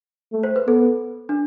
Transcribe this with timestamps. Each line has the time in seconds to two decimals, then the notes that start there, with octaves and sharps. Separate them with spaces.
0.33 A3
0.43 C5
0.56 B4
0.67 B3 A4
1.29 D4